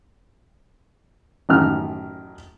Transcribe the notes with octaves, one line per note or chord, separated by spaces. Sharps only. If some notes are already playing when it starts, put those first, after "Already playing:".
A1 F#2 D#3 F6